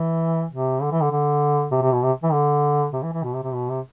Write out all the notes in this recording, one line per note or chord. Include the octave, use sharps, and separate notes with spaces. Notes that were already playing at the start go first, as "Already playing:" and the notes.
Already playing: E3
C3
D3
E3
D3
D3
C3
C3
B2
C3
E3
D3
C3
E3
E3
B2
C3
C3
B2
C3